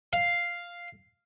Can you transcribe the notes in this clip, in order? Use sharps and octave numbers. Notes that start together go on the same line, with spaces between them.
F5